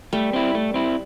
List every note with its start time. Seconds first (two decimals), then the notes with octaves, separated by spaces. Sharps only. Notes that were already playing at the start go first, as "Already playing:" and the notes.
0.13 G3 A3
0.33 C4 E4
0.55 A3
0.74 C4 E4